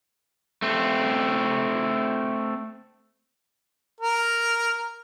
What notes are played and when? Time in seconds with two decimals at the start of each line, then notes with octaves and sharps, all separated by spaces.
0.62 A3 C4
4.00 A#4